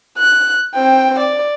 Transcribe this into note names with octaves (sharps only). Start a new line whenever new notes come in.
F#6
C4 G5
D5